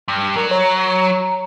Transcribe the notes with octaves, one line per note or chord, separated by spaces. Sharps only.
G2
F#3 A#4
C#5 A#5